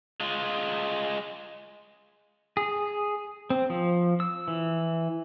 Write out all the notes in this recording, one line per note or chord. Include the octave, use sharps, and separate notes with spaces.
G#3 F4
G#4
C4
F3
E6
E3